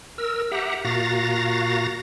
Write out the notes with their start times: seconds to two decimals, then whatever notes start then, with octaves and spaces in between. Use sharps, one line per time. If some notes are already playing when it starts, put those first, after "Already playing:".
0.18 A#4 E6
0.51 G4 E5 F#5 A#5
0.85 A#2 F#4 F5 A#5 A6 A#6